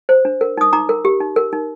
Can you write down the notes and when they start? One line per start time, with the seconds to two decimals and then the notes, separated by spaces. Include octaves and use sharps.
0.09 C5
0.25 D4
0.41 A#4
0.57 D#4 D#6
0.73 D#4 A#5 D6
0.89 A#4
1.05 G4
1.20 D#4
1.36 A#4
1.53 D#4